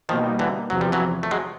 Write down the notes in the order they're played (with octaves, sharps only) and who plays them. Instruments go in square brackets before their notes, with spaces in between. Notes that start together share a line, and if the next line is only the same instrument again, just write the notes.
[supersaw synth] B2 G3 A#3 D#4 [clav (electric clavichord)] D#3 F3
[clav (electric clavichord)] D3 E3
[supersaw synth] E2 C3 F3 [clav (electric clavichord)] F#3
[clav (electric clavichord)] G3
E3 F#3
A3
F#3 G#3